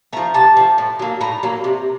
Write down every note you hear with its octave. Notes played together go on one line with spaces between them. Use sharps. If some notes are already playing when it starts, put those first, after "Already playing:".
F3 A3 A#5
C3 A5
F3 A3
A2
F#3 A#3
A2 A#5
F#3 A#3
C3